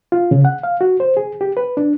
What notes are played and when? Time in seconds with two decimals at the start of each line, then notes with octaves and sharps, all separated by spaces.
0.12 F4
0.31 C#3
0.45 F#5
0.63 F5
0.81 F#4
1.00 C5
1.17 G#4
1.41 G4
1.57 B4
1.77 D4